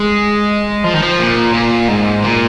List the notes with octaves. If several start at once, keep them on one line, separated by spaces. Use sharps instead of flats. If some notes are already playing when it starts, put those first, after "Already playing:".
Already playing: G#3
F3
D#3
F3
A#2
A#2
G#2
A#2